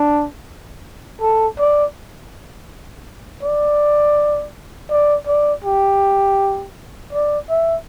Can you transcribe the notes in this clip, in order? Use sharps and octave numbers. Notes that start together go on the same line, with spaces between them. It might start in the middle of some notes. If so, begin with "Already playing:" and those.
Already playing: D4
A4
D5
D5
D5
D5
G4
D5
E5